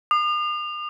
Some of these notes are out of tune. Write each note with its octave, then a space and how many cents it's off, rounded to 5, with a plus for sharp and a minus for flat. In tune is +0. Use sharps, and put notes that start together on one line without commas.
D#6 -45